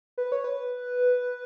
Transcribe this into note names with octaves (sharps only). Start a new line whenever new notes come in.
B4
C#5
B4